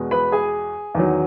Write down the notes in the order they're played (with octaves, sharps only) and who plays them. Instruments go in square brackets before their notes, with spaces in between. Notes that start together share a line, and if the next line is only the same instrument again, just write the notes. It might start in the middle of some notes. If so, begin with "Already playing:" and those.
Already playing: [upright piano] E2 B2 G#3
B4 B5
G#4 G#5
E2 D#3 F#3